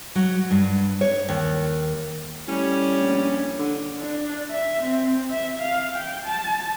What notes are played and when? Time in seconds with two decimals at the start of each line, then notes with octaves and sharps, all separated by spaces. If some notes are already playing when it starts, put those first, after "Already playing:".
0.15 F#3
0.51 G2
1.01 C#5
1.28 D#2
2.47 A2 G3 C#4
3.01 A#1
3.59 D3
4.01 D4
4.51 E5
4.84 C4
5.30 E5
5.61 F5
5.96 G5
6.25 A5